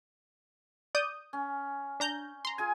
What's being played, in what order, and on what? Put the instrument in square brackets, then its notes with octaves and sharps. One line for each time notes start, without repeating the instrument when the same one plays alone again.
[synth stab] D5 D#6 G6
[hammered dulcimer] C#4
[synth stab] D4 A#5 G6
A#5 C6
[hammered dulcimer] F4 G#4 G#5